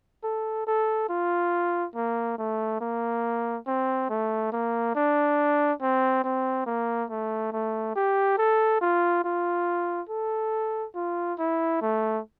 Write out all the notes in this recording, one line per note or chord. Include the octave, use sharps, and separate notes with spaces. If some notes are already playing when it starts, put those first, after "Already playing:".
A4
A4
F4
A#3
A3
A#3
C4
A3
A#3
D4
C4
C4
A#3
A3
A3
G4
A4
F4
F4
A4
F4
E4
A3